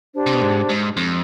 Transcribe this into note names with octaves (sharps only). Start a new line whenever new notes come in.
D4 G4 C5
C3
B2
G#2
G#2
F2